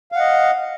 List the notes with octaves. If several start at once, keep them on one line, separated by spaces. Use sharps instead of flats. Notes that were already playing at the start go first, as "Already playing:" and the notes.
D#5 F5 F#5